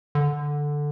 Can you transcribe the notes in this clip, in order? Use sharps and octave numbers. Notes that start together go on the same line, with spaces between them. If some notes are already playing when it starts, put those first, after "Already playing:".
D3